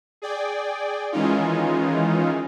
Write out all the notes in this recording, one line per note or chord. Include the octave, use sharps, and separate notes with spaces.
G#4 D5 G5
D#3 E3 G#3 C#4 D#4 F4